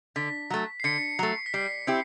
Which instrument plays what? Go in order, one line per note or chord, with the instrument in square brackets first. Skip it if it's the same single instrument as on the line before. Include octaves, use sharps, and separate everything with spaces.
[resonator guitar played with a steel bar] D3 [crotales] B6
[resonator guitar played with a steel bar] F#3 A3
[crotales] C7
[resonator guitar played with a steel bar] D3 [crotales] B6 C#7
[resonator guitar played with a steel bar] F#3 A3
[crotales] B6
[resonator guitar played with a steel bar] G3 [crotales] C7
[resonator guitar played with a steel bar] C4 E4 G4